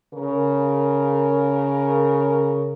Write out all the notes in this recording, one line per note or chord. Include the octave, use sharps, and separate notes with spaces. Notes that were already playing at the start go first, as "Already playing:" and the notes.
C#3 A#4